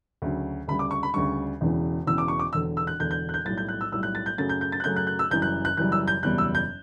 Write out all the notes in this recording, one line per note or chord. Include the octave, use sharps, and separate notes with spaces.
D2 C#3 F#3
D2 C#3 G3 B5
D6
C#6
B5
D2 C#3 G3 C#6
E1 E2 C#3 E3
E1 E2 C#3 E3 E6
D6
C#6
D6
E1 E2 D3 E6
E6
F#6
E1 E2 D3 G6
G6
F#6
G6
B1 A2 G3 A6
G6
F#6
E6
B1 A2 G3 E6
F#6
A6
G6
F#2 C#3 F#3 A3 A6
G6
G6
A6
F#6
F#2 C#3 F#3 A3 G6
F#6
F#6
E6
F#1 F#2 E3 G3 G6
F#6
F#6
F#1 F#2 E3 G3 F#6
E6
G6
F#1 E2 B2 G3 F#6
E6
G6